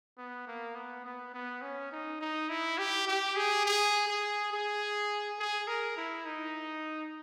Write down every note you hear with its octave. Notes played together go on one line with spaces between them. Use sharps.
B3
A#3
B3
B3
B3
C#4
D#4
D#4
E4
G4
G4
G#4
G#4
G#4
G#4
G#4
A#4
E4
D#4